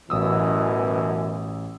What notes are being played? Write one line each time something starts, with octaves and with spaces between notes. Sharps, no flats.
A1 F#2 B2 E3 D#6 E6